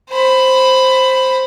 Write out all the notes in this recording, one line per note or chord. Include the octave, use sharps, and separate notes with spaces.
C5 B5